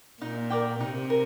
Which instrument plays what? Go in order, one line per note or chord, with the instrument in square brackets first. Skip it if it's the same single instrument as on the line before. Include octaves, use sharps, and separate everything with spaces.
[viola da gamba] A#2 [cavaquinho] D#4
[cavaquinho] A#4 D5 G5
[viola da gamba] C3 [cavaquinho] D#4
[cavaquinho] A#4